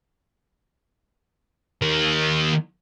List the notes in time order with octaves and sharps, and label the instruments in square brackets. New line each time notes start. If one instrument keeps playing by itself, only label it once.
[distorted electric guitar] D#3 A#3